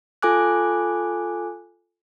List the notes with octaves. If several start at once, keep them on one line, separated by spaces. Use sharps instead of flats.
F4 A4 G#5 D6 F#6